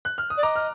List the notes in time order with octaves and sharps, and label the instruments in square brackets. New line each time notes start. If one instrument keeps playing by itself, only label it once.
[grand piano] F#6
F6
D#6
[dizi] D5
[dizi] D#5 [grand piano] A#5 D6
[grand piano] F6